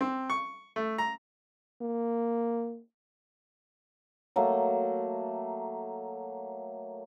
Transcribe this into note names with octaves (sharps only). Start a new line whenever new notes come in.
C4
C#6
A3
A#5
A#3
F#3 A3 A#3